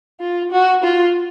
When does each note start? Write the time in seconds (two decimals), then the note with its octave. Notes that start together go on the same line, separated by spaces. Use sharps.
0.20 F4
0.51 F#4
0.83 F4